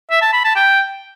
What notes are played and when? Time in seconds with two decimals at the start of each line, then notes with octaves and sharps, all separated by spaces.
0.11 E5
0.22 A5
0.33 B5
0.44 A5
0.56 G5